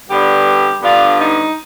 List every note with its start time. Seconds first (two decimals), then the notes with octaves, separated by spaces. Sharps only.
0.09 G2 D3 G3 B3 G4
0.82 G2 D3 G3 B3 F4
1.18 D#4